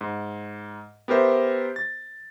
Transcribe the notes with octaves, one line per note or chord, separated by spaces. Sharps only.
G#2
B3 G4 A#4 C5 E5
A6